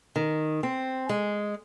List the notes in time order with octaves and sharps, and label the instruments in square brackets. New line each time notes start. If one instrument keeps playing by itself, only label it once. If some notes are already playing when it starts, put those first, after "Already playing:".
[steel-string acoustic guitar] D#3
C4
G#3